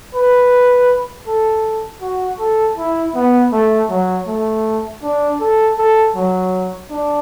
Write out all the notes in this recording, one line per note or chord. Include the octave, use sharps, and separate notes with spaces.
B4
A4
F#4
A4
E4
B3
A3
F#3
A3
D4
A4
A4
F#3
D4